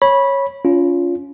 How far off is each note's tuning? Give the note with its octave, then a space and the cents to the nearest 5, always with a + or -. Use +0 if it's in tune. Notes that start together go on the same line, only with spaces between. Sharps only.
C#5 -10 B5 -15
C#4 +30 F4 +0